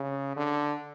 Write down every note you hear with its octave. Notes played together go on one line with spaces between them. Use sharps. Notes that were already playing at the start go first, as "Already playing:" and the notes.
Already playing: C#3
D3